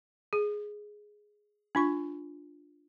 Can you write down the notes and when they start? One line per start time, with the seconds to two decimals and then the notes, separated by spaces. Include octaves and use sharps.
0.33 G#4
1.75 D4 F4 C#6